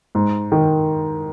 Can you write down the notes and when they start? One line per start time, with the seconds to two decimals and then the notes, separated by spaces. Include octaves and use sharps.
0.15 G#2
0.52 D#3